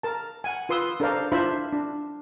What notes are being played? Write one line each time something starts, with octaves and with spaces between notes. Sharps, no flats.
A#4 A5
F#5 G#5
F4 B4 C6 D#6 E6
D4 A4 A#4 C5 D5 F5
D4 E4 F4 C5 E5 B5
D4